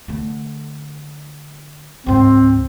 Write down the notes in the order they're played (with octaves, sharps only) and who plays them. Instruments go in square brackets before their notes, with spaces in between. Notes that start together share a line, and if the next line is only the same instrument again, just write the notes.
[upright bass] D3 A3
[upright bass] C#2 G#2 [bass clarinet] C4